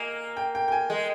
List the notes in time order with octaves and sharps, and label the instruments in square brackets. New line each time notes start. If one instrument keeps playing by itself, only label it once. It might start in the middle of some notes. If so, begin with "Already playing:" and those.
Already playing: [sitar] A#3 [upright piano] D#5 G#5
[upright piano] G5
G5
G5
G#5
[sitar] G#3